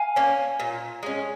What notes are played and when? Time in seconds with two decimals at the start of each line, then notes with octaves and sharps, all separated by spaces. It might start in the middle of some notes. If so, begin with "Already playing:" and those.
Already playing: F5 G#5
0.16 A#3 C#4
0.60 A#2
1.03 G#3 C#4